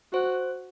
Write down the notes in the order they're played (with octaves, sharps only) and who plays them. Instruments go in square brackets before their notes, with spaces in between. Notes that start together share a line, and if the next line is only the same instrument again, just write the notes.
[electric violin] F#4 [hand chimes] C5